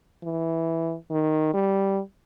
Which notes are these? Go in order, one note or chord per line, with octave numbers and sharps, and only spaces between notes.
E3
D#3
G3